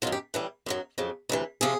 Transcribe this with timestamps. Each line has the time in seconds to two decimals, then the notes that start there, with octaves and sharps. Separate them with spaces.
0.02 F#2 D#3 F#3 F4
0.12 G4
0.34 A2 E3 G3
0.66 F#2 D#3 F#3
0.98 F2 C#3 F#3
1.29 D2 C3 E3
1.61 C3 F3 G#4